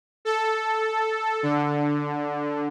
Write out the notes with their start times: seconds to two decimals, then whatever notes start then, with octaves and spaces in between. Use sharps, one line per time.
0.25 A4
1.43 D3